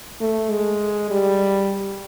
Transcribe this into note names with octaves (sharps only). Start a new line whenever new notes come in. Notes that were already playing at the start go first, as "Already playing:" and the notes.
A3
G#3
G3